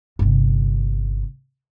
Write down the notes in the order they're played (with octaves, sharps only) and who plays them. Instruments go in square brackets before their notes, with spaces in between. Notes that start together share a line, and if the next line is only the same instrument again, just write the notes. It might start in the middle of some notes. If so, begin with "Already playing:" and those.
[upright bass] G1 C3